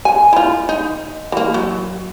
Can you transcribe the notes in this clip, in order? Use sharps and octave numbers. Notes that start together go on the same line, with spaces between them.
G#5
E4 F4
D#4
E3 A#3
F#3